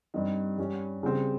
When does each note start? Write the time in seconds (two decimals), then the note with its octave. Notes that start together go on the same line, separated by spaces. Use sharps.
0.14 G2 G3 C4 D#4
0.58 G2 G3 C#4
1.03 C#3 G3 C4